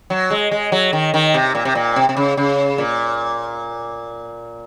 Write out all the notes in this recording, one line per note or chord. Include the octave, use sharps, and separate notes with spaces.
F#3
G#3
G#3
F#3
D#3
D#3
C3
A#2
C3
A#2
C3
C3
C#3
C#3
A#2